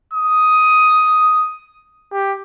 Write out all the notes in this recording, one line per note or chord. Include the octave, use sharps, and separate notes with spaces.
D#6
G4